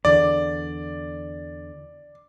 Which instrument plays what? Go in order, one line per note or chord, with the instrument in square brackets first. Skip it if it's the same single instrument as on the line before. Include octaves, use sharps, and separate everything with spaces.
[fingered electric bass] E2 D3 [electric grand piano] D5